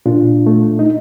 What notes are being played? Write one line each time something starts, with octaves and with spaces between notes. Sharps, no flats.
A#2 D4 F4
A3
D#4